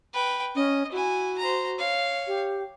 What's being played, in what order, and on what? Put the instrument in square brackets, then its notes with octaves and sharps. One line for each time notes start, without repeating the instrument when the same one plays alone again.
[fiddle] B4 G5
[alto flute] C#4 [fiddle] D#5
[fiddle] E4 G#5 [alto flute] F#4
[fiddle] C5 A#5
C#5 F5
[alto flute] G4